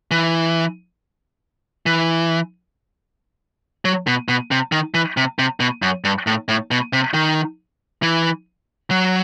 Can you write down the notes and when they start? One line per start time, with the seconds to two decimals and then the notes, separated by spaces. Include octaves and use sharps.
0.11 E3
1.86 E3
3.85 F#3
4.07 B2
4.28 B2
4.51 C3
4.72 D#3
4.94 E3
5.17 C3
5.39 C3
5.60 B2
5.82 F#2
6.04 G2
6.27 A2
6.48 A2
6.71 B2
6.93 C3
7.14 D#3
8.03 E3
8.91 F#3